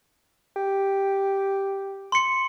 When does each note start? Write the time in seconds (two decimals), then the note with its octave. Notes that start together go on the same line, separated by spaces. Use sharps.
0.56 G4
2.12 C6 C#7